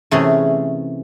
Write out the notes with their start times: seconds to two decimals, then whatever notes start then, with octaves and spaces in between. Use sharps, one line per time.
0.11 C3 E3 A3 C#4 G#4